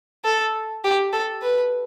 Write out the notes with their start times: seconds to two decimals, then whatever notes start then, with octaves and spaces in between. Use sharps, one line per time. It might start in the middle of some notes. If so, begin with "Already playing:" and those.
0.25 A4
0.84 G4
1.13 A4
1.42 B4